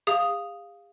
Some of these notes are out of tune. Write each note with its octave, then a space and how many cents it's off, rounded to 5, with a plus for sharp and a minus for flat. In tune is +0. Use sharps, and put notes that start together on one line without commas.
G#4 -45 F5 +0 D#6 +0